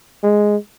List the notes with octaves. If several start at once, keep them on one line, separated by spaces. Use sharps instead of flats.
G#3